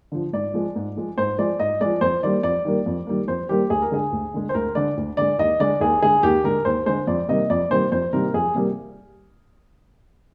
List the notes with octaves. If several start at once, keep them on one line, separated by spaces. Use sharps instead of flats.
D3 F3
G#2 D5
F3 G#3
G#2
F3 G#3
G#2 C5
F3 G#3 D5
G#2 D#5
F3 G#3 D5
F2 C5
D#3 G3 A#3 D5
F2 D5
D#3 G3 A#3
F2
D#3 G3 A#3
F2 C5
D#3 G3 A#3 G4
D2 G#4
A#4
D3 G#3 G#4
D2
D3 G#3
C5
D2 A#4
D3 G#3 D5
D2
D3 G#3 D5
D#2 D#5
D3 G#3 D5
D#2 G#4
D3 G#3 G#4
D#2 G4
D3 G#3 A#4
D#2 C5
D3 G#3 C5
F2 D5
C3 D#3 G3 A#3 D#5
F2 D5
C3 D#3 G3 A#3 C5
F2 C5
C3 D#3 G3 A#3 A#4
F2 G#4
C3 D#3 G3 A#3